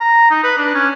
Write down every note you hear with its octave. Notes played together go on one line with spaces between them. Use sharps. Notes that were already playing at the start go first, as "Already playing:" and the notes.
A#5
D#4
B4
D4
C#4